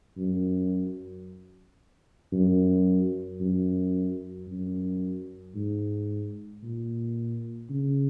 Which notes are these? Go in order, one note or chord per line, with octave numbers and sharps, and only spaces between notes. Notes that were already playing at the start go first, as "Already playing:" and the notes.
F#2
F#2
F#2
F#2
G#2
A#2
C#3